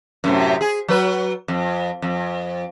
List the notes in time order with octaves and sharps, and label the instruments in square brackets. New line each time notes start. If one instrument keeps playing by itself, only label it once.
[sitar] F#2 A2 C3
G#4
F#3 B4
F2
F2